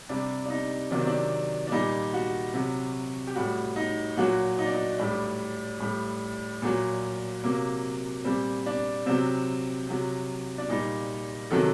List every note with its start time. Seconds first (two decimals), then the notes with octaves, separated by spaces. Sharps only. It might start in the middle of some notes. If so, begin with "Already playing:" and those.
0.09 C3 G3 D4
0.46 D4
0.50 D#4
0.91 C3 D#3 F#3 D4
0.99 C4
1.07 D4
1.67 D4
1.72 A#2 G3 D#4
2.14 F#4
2.54 C3 F#3
3.27 G4
3.35 A2 G3 F#4
3.76 D#4
4.17 A#2 F#3 F#4
4.59 D#4
4.66 D4
4.74 D#4
4.99 A2 G3 D4
5.80 A2 G3
6.62 A#2 F#3
7.44 C3 F#3 A#3
8.24 A#2 G3 C4
8.66 D4
9.06 C3 F#3 C4
9.89 C3 F#3
10.58 D4
10.69 A#2 G3 D#4
11.51 C3 D#3 F#3 A4